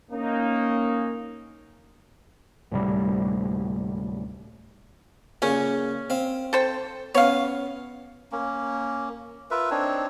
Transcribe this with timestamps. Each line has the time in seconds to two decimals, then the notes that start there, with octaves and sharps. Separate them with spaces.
0.11 A#3 C#4 D#4
2.71 D2 A2 C3 G3
5.42 A#2 C#3 C#4
6.10 C4 F5
6.53 A4 C5 G5
7.15 B3 C#4 C#5 F5
8.32 A#3 C#4
9.51 F4 A#4 B4 E5
9.71 C4 D4 D#4 C#5